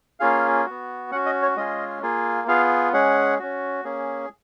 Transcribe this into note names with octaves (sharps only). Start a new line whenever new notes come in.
A#3 C#4 F4 G#4 F5
B3 F#4
C#4 F#4 F#5
D#5
C#5
G#3 C#4 F4 G#4 D#5
A#3 F4 G#4
B3 F4 G#4 F5
G#3 C#4 G#4 F#5
C#4 F#4
A#3 C#4 G#4